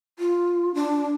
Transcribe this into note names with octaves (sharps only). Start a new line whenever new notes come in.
F4
D4